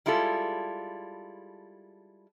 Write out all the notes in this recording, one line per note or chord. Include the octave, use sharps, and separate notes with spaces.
G3 G#3 E4 F4 A4